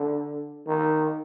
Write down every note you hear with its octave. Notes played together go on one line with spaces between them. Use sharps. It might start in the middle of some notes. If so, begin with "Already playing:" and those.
Already playing: D3
D#3